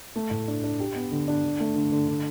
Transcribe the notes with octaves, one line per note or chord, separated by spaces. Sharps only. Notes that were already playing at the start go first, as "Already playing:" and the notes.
A3
A2
D4
D4
G4
B3
D3
D4
D3
A3
D3
D3
D3